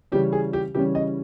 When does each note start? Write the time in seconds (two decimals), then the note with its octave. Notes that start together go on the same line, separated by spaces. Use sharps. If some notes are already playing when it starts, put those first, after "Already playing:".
0.12 C#3 E3 G3 C#4 G4
0.32 G#4
0.53 G4
0.74 C#3 E3 G3 C#4 G4
0.95 D#5